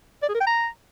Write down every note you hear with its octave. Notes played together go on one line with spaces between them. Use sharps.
D5
G#4
A#4
G5
A#5